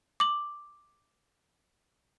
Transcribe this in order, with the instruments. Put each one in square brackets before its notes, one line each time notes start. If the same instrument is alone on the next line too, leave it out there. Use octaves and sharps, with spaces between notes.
[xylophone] D6 F#7